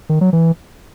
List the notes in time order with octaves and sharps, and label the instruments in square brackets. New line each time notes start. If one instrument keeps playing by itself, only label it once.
[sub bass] D#3
F#3
E3